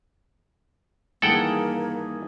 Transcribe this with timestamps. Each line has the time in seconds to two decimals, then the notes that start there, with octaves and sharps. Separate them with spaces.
1.22 G2 D#3 E3 A#3 G#4 A4 F#5 G5